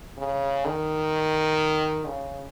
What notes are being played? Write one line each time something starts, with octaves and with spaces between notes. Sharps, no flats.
C#3
D#3
C#3